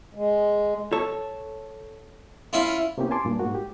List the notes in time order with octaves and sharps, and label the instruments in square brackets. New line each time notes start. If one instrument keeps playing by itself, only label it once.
[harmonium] G#3
[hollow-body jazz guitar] A4 C#5
[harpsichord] C#4 E4 F4
[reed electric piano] C3 A#3 B3 C#4 E4 G4
G#5 A5 C6 D6
G2 A#2
G#2 A#3 F#4
G4